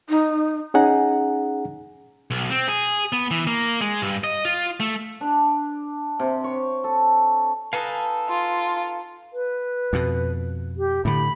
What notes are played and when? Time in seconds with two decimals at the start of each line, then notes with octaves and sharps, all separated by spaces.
0.09 D#4
0.74 C#4 D#4 G#4 F#5 G#5 A#5
2.31 B1
2.50 C4
2.68 G#4
3.13 B3
3.31 E3
3.47 A#3
3.81 G#3
4.02 G2
4.24 D#5
4.45 F4
4.80 A3
5.21 D4
6.19 C3
6.44 C#5
6.84 A4
7.73 D#4 A4 B4 F5 G#5 A5
8.29 F4 C6
9.33 B4
9.93 F2 B2
10.77 G4
11.05 A2 D3 B5